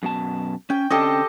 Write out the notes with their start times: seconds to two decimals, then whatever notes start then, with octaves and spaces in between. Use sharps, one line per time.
0.03 F#2 B2 A5
0.70 C#4 G5
0.90 D3 C4 C#4 G4 A4 D#5